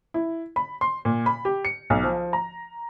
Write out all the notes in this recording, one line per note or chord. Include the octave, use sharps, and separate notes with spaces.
E4
B5
C6
A#2
B5
G4
C#7
B1
F3
A#5